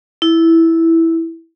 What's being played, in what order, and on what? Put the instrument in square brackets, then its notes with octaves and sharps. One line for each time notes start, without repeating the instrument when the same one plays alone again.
[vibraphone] E4